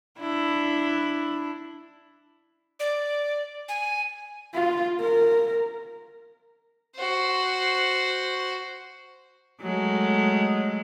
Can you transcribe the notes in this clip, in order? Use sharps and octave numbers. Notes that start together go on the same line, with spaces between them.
D4 E4
D5
G#5
F4
A#4
F#4 C5
F#3 G#3 A3